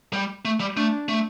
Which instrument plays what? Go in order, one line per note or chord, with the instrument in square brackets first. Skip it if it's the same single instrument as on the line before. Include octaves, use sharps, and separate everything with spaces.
[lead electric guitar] G3
A3
G3
[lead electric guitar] A3 [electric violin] D4
[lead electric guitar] A3